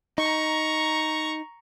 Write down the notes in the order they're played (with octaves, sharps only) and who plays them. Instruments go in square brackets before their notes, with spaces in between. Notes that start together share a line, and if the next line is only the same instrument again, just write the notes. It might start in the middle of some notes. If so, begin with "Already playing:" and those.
[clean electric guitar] D#4 [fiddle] A#5 C#6